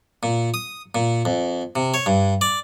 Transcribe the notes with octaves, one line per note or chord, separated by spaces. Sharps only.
A#2
D#6
A#2
F2
C3
C#5
G2
D5